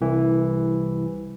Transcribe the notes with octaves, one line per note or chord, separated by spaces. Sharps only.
C2 E3